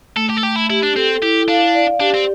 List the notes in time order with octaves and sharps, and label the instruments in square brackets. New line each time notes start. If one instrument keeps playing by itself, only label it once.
[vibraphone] A3 [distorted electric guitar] A4
[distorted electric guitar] G4
A4
[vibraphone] A3 [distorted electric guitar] G4
[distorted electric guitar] E4
[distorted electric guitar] E4 [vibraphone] G4
[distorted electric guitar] D4
[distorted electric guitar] C4 [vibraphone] A4
[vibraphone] E4 [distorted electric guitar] G4
[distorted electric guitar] D4 [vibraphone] F5
[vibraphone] D5
[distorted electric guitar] D4 [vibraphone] G4
[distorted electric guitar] C4